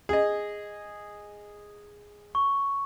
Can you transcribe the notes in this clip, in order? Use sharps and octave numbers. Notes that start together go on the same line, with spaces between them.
G#4 D#5
C#6